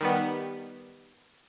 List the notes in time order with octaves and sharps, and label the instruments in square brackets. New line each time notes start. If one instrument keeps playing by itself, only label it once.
[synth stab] D#3 G3 B3